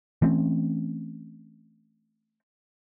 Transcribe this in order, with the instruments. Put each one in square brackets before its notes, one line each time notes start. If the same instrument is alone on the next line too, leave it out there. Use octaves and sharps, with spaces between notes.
[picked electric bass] E3 A3 C4 C#4